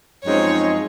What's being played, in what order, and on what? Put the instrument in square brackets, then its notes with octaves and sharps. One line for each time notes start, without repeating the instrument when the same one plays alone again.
[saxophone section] F#2 F3 G#3 C4 D#4 [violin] C#5